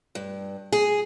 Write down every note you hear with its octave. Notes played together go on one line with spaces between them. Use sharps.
G2
G#4